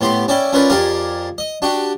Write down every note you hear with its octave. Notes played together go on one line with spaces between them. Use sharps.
A2 B3 G4 C6
C#4 E4 D5 G5
C#4 F4 A#4 B4 D5
F2 G4 G#4 A#4 D5 F5
D#5
D4 F#4 G4